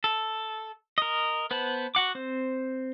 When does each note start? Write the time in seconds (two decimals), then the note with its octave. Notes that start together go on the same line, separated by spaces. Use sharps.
0.04 A4
0.98 A#4 D#5
1.51 B3 B4 C5 A5 B5
1.95 F#4 F#5 D6
2.15 C4 C5